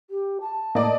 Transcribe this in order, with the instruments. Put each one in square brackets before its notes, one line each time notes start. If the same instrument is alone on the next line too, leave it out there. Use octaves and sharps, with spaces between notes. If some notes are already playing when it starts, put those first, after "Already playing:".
[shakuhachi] G4
A5
[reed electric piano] A2 A#3 [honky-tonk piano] D5 D#5